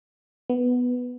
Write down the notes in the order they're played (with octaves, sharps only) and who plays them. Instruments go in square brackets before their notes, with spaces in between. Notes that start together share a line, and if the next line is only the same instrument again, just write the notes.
[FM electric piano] B3